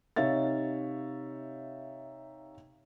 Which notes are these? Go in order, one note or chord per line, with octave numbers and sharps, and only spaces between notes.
C3 D#4 C#5 E5 F5 A6